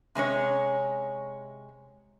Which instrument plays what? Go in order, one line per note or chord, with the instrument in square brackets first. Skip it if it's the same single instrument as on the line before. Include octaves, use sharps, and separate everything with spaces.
[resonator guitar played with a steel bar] C3 G#3 C#4 C#5